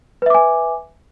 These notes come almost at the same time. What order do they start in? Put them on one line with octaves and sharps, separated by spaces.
B4 E5 D6 G#5